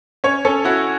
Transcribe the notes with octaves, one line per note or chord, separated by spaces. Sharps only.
C#4 C#5
C#4 A4
E4 F#4